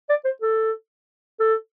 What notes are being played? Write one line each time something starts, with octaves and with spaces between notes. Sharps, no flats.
D5
C5
A4
A4